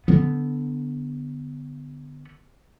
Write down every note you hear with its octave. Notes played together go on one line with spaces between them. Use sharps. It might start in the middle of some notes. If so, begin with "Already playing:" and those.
D3 B3